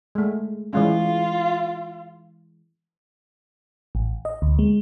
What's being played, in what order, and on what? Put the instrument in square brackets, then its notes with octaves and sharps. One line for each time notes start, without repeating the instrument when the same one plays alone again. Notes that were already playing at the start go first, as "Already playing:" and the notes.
[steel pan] G#3 A3
[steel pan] E3 G#3 C#4 [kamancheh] F4
[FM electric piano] A1
D#5
D2
G#3